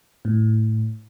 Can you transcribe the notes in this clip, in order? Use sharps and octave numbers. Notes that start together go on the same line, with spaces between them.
A2